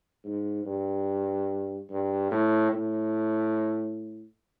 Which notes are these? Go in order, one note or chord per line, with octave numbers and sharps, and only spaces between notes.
G#2
G2
G2
A2
A2